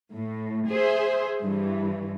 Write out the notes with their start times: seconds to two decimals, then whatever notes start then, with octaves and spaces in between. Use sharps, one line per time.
0.12 A2
0.69 G#4 C5 E5
1.42 G2 E3